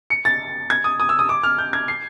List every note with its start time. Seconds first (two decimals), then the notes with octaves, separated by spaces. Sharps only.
0.10 C#7
0.25 A6
0.70 G#6
0.84 D#6
1.00 D#6
1.09 E6
1.19 D#6
1.29 D6
1.43 F6
1.58 G6
1.73 G#6
1.88 C7